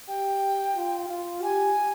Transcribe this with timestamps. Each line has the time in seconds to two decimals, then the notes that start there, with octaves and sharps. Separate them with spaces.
0.08 G4 G5
0.75 F4
1.10 F4
1.43 G4 G#5